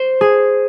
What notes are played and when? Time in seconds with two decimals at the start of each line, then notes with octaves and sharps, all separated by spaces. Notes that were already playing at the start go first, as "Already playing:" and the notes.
Already playing: C5
0.21 G#4